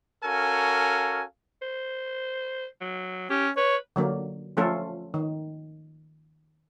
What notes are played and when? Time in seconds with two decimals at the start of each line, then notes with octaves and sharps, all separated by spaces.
0.24 C#4 F#4 A4 A#4 F5 G#5
1.62 C5
2.81 F#3
3.30 C#4 G4
3.57 B4 C#5
3.96 D3 F#3 A#3
4.57 F3 A3 C#4 F4 A4
5.14 D#3